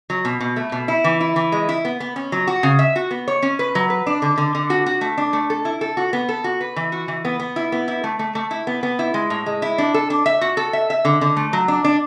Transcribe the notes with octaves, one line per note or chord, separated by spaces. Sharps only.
F#3
B2
B2
A3
B2
E4
E3
E4
E3
G#3
E4
B3
B3
C#4
F#3
F#4
C#3
E5
F#4
B3
C#5
C#4
B4
F#3
B4
D4
D3
D3
D3
F#4
F#4
A3
D4
A3
A4
E4
A4
F#4
B3
A4
F#4
B4
E3
F#4
E3
B3
B3
E4
B3
E4
A3
A3
A3
E4
B3
B3
E4
G#3
A2
G#3
E4
D4
A4
D4
E5
F#4
A4
E5
E5
D3
D3
A3
F#3
D4
D4